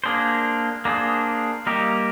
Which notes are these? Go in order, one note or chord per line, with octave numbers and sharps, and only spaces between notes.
A#3 D4 G#4 C5
A#3 D4 G#4 C5
G3 A#3 D#4 G4 A#4